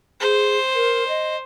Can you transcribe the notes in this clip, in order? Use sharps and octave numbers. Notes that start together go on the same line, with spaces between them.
G#4 C5
A#4
D#5